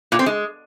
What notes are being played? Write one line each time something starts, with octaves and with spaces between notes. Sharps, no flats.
A#2
C4
G#3